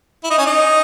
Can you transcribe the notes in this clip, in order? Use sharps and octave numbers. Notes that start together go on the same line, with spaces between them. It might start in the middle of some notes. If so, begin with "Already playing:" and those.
E4
D#4
C#4
D#4